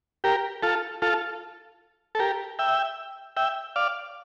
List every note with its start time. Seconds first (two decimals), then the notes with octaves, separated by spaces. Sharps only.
0.24 G4 A#4
0.63 F4 A4
1.02 F4 A4
2.15 A4
2.19 G4 A#4
2.59 E5 G5
3.37 E5 G5
3.76 D5 F5